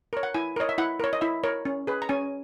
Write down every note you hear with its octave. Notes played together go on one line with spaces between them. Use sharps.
A#4 C#5
F#5
E4 G#5
A#4 C#5 D#5
E5
E4 F#5
A#4 C#5
D#5
E4 E5
A#4 C#5
C#4
G#4 B4
A#5
C#4 G#5